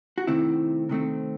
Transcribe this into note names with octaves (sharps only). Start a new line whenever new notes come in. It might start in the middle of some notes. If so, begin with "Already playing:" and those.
F#4
C3 D#3 A3 C4 E4
C3 D#3 A3 C4